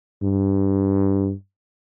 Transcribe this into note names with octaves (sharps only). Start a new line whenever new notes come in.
G2